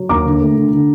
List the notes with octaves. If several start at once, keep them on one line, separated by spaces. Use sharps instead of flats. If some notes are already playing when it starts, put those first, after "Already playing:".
Already playing: F#3
D#2 A#5 D6
D3
A3
D3
D3